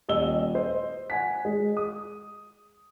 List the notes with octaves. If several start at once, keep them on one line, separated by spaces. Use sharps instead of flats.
D#1 D#5 E6 G7
C5 D#5
F#5 G#5 B6
G#3
D#6